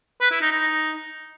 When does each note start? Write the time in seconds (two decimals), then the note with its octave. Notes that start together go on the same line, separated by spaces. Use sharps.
0.21 B4
0.31 E4
0.41 D#4
0.51 D#4